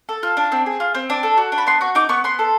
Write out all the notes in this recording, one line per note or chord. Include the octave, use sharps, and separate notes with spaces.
A4
F4
D4
C4
G#4
F4
C4
D4
A4
F#4
D4
B5
B3 C6
F#4 C#6
D#4 D6
B3 C#6
B3 C6
A4